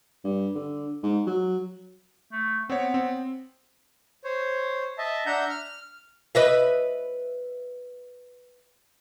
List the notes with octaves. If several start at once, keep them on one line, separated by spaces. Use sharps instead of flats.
G2
D3
G#2
F#3
A3
B3 C4 C#5
C4
C5 C#5
D#5 E5 A5
D4 E5 F#5 A#5 G6
F6
B4 D#5 E5